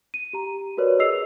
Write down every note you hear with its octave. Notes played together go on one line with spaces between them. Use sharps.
D#7
G4 A#5
F#4 A#4 B4 C#5 D5
G#4 D#5 E6 C7 F7